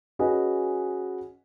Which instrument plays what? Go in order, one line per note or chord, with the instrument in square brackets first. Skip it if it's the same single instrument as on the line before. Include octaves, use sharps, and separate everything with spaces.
[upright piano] C#4 F#4 G#4 B4 D#5